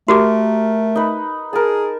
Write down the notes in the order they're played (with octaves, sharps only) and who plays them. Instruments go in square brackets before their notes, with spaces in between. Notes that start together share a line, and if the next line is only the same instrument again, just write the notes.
[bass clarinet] A3 [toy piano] F#4 G4 D6 [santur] A#4
[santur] D#4 B4
[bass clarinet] G#4 [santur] A#4 A5